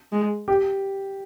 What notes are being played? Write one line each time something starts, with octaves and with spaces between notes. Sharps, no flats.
G#3
G4